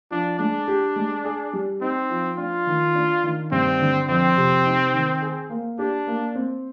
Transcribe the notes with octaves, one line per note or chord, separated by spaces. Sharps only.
F3 D4
G#3 D4
G4
G#3
G#4
G3
C4 D#4
F3
D4 F4
D#3
D4
D#3
G2 C4
D3
F2 C4
C3
D#4
D#3
G#4
A#3
D4 G4
A#3
C4